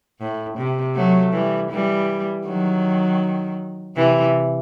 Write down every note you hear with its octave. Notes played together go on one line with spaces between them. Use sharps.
A2
C3
F#3 A3
E3 G3
E3 G3
D#3 F#3
C3 E3